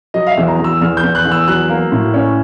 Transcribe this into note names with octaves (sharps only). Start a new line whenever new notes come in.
F#3 D#5
F5
E5
E2
A#5
E2
E6
E2 F6
G6
E2
F#6
E2
E6
F#3 F#6
A#3
A2
C#4